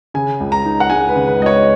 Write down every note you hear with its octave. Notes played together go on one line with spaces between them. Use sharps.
C#3 G#5
C#2
A#5
D#4
F#5
G#3 G#5
B4
C#3
B4
C#2 D#5
C#5